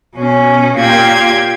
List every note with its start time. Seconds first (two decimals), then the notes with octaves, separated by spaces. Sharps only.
0.16 B2 C#4
0.77 A#2 A#3 G4 G5 G#6